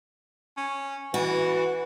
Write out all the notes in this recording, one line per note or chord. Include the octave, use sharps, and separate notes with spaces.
C#4
E3 F#4 B4